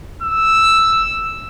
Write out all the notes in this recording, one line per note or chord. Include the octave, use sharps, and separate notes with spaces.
E6